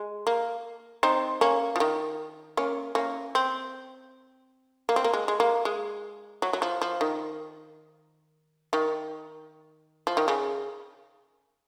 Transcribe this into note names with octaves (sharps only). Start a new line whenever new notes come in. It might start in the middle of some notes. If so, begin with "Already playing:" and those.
Already playing: G#3
A#3
C4 D#4
A#3 C#4
F3
D#3
A#3 C#4
A#3 C#4
C4
A#3
C4
A#3
G#3
G#3
A#3
G#3
F#3
F#3
F3
F3
D#3
D#3
F3
D#3
C#3